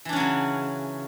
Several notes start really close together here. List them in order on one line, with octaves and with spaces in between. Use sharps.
E3 D4 C#4 F#3 C#3